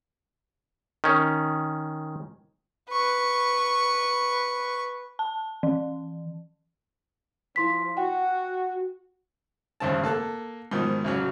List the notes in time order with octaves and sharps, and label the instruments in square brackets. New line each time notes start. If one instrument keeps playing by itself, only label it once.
[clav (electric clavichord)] D#3 C#4
[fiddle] B4 C#6
[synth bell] A5
E3
[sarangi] F3 [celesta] E4 C6 B6
[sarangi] F#4 [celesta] F#5 G5
[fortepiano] G#1 G2 C#3 C4 A5
A#3 A4 A5 F#6
G#2 B2 D#3 F3
A1 C#3 F#3